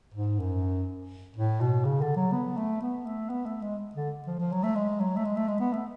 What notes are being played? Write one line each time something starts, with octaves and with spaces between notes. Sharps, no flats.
G#2
F#2
A2
B2
C#3
D3
F#3
B3
A3
B3
A3
B3
A3
G#3
D3
F3
F3
F#3
A3
G#3
F#3
A3
G#3
A3
G#3
B3
A3